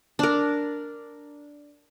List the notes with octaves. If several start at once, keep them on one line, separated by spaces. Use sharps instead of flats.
D4 A#4